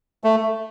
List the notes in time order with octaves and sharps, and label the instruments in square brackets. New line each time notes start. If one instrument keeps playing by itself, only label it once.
[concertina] A3